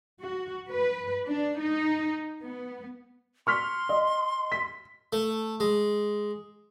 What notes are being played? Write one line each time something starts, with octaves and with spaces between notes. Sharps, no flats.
F#4
B4
D4
D#4
B3
C6 C#6 F6 B6
D#5
B6
A3
G#3